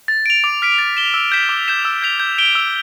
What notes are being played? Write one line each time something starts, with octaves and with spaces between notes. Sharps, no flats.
A6
D7 F7
D6
F6 B6 D7
A6
E7 G7
E6
G6 B6 E7
D6
G6 B6 E7
E6
G6 B6 F7
G6
D7 G7
E6